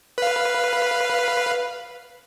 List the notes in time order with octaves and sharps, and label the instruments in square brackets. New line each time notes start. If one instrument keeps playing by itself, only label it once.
[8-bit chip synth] B4 F5